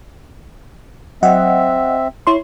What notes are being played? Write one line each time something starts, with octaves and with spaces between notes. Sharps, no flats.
F#3 C4 D#5 E5 F#5
E4 C#5 C6